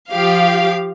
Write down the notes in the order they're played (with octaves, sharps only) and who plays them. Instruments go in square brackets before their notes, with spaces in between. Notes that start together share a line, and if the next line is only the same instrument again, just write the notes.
[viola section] F3 G4 [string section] F5